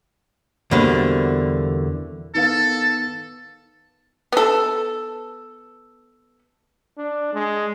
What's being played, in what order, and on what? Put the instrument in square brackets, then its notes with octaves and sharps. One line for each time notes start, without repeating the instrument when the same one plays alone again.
[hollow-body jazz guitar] E2 B2 D3 G3 A#3 C4
[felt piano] D#3 B3 F5 [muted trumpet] A4
[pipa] B3 A4
[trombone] D4
G#3